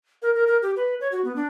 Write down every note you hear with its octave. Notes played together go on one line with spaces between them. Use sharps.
A#4
A#4
A#4
G4
B4
C#5
F#4
B3
D4